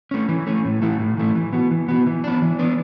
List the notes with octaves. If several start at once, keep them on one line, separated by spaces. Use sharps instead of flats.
A3 C#4
E3
A3 C#4
A2
E3 A3 E4
A2
E3 A3 E4
E3
B3 F#4
E3
B3 F#4
E3
B3 D4
E3
B3 D4